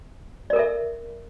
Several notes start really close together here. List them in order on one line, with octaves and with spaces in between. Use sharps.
D5 A#4 A4 E5